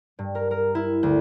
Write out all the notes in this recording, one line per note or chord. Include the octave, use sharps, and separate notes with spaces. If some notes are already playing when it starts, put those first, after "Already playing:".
G2
A#4
A#4
E4
D2